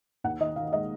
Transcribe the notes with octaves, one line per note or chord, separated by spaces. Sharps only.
D#2 F#5
D#3 D#5
D#3 F5
G#3 D#5